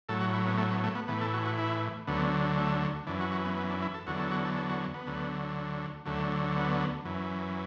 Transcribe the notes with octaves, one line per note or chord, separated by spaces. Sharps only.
A2 F#3 A4
F#4
E4
B3
A3
B3
A3
B3
A2 E3 B3
A4
F#4
F#4
E4
D2 D3 F#3 B3
A3
F#2 E3 D4
F#4
F#4
B3
B3
D4
E4
A4
E2 D3 F#3 F#4
A4
F#4
A4
A4
F#4
B3
D2 D3 F#3
D2 D3 F#3 A3
B3
F#2 E3